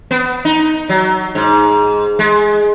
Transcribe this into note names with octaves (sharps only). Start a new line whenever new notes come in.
B3
D#4
F#3
G#2
G#3